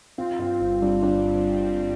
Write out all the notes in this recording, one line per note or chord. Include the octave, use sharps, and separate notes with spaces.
C4 F4
G2 F4
G1 F4
G3 D4
C4 D4
G2
G1
G3